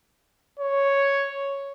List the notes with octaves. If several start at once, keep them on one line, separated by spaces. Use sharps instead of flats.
C#5